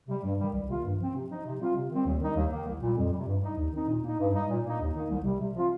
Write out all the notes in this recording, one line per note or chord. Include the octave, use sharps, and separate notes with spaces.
C3 G3
G2
D#3 G3
C2
C3 D#3 A#3 F4
G2
F3 C4
C3
F3 D#4
C3
G3 C4 F4
C3
D#3 G3 C4
D#2
D#3 G3 D#4
D#2
D#3 A#3
C2
A#2 G3
F2
G3
C3
G2
G3 D#4
D#2
D#3 C4 D#4
A#2
A#3 D#4
G2
G3 D#4
A#2
A#3 D#4
D#2
D#3 A#3 D#4
C2
C3 G3
C3
F3 C4 F4